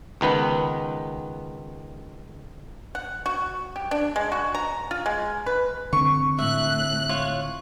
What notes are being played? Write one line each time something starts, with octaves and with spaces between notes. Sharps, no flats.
C#2 D#3 B3 B4
F#5
F#4
G4
D4
G#3
F#4
A#5
F4
G#3
B4
D3 C4 C#6
A2 E5 F#6
F4 C#5